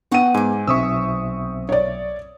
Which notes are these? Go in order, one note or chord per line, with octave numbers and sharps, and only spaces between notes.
B3 F#5 G5 C#6 D#7
G#2 G#5 D6
B1 C4 E5 C#6 D#6 E6
C#5 D5